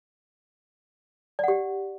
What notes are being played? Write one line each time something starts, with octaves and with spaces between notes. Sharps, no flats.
G4 D5 F#5